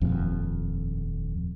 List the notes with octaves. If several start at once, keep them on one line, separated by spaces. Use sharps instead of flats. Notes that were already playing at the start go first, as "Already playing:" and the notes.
D#1 F2